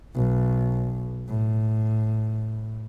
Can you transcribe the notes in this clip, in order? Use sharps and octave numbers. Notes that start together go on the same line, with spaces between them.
B1
A2